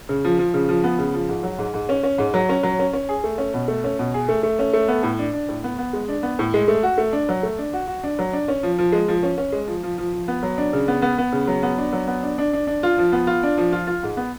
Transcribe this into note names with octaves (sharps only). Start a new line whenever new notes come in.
C#3
F3
F3
C#3
F3
B3
C#3
F3
G#2
F#3
G#2
G#2
C#4
C#4
G#2
F#3
C#4
F#3
C#4
C#4
G#4
A3
C#4
B2
A3
C#4
B2
G#4
A3
A3
C#4
A3
B3
A2
D4
D4
A2
B3
B3
G#3
D4
B3
A2
G#3
A3
F#4
A3
D4
F#3
A3
D4
F#4
F#4
D4
F#3
D4
C#4
F3
F3
G#3
F3
C#4
C#4
G#3
F3
F3
F3
F3
B3
F#3
D4
C#3
B3
B3
B3
C#3
F#3
B3
D4
F#3
B3
D4
D4
D4
D4
F4
F3
B3
F4
D4
F3
F4
F4
G#2
B3